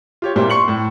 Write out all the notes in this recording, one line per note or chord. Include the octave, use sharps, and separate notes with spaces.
F4 G4 C#5
A#2 G3 C4 E4
C6 C#6 C#7 F#7
A2